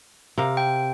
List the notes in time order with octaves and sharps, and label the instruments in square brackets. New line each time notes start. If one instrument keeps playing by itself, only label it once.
[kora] C3 A#4 F5
[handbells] G5